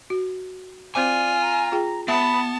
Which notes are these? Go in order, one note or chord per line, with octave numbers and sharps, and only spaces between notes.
F#4
C4 F4 C5 D5 G#5 D6
A#5
F4 G#4 G5
B3 E5 A5 B5